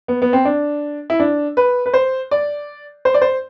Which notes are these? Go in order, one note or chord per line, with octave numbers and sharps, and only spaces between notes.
B3
B3
C4
D4
E4
D4
B4
B4
C5
D5
C5
D5
C5